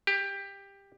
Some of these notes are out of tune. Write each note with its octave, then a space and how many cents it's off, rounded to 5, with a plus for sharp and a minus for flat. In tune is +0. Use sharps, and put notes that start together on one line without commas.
G4 +15